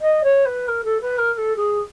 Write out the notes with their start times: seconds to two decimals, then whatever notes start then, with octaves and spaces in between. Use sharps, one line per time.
0.01 D#5
0.23 C#5
0.45 B4
0.68 A#4
0.84 A4
1.01 B4
1.18 A#4
1.34 A#4
1.37 A4
1.56 G#4